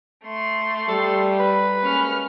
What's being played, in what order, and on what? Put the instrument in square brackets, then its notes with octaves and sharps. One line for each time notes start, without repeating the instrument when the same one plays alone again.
[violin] A3 C6
[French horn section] G3 [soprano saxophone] A4
[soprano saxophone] B4
[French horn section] G#3 A#3 [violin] C#4 F6